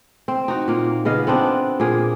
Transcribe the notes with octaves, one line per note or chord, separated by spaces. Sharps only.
C4
D#4 F#4
A#2 A#3
C#3 B3 D#5 F5
B3 C4 D4
A#2 A#3 G#4